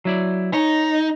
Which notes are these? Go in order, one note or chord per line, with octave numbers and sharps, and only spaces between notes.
F#3 E4 D5
D#4 C#5